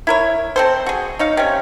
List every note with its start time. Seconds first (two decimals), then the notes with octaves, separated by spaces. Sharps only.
0.07 E4 A#4 C#5
0.56 C4 A4 C5
0.86 F#4 G#4
1.19 D#4 C#5 F5
1.37 C3 C#4